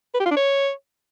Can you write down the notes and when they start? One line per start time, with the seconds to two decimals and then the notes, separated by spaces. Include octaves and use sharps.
0.14 B4
0.20 G4
0.25 F4
0.31 D4
0.37 C#5